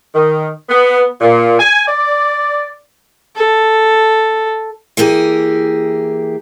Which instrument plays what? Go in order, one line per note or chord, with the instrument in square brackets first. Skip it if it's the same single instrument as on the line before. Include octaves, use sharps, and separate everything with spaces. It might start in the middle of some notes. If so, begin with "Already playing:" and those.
[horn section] D#3
B3
A#2
G#5
D5
[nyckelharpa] A4
[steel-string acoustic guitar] E3 A#3 G4 G#4